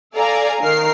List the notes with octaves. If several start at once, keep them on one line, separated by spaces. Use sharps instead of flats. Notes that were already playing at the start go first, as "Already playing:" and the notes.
A4 D5 F5 G#5 A#5
D#3 A#4 F6 C7